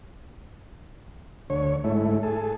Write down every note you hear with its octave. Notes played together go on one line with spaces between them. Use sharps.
D2 C#5
G#2 A3 E4
G#4 A4